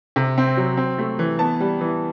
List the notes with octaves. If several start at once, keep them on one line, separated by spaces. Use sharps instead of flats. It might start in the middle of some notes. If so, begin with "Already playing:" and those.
C3
C4
F#3
C4
A3
E3
B3 A5
G3
E3